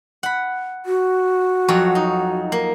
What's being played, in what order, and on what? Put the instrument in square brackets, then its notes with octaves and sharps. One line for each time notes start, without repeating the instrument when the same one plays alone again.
[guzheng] F#5 B5
[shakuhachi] F#4
[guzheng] F2 F#3 C#5
D#4
A#3